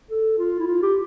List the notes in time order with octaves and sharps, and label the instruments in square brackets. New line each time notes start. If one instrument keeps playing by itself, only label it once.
[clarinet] A4
F4
E4
F4
G4